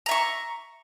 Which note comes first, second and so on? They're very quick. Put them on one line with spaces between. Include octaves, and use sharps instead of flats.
A#5 E5 C#6